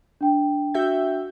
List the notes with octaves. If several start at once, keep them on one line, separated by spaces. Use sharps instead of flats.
D4 G5
F#4 E5 G6